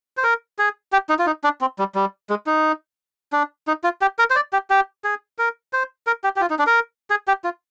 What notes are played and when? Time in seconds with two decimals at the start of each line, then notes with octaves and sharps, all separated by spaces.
0.17 C5
0.23 A#4
0.59 G#4
0.92 G4
1.09 D#4
1.19 F4
1.26 D#4
1.44 D4
1.61 C4
1.79 G3
1.95 G3
2.30 G#3
2.46 D#4
3.33 D4
3.67 D#4
3.84 F4
4.01 G4
4.19 A#4
4.30 C5
4.36 D5
4.53 G4
4.70 G4
5.04 G#4
5.38 A#4
5.73 C5
6.07 A#4
6.24 G4
6.36 G4
6.41 F4
6.50 D#4
6.59 D4
6.67 A#4
7.10 G#4
7.28 G4
7.44 F4